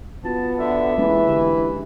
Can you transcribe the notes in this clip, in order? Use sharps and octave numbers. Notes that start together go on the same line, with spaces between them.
B3 F4 F#4 A5
D3 E5
E3 G#3 A#3 C#4 B4
D3 G4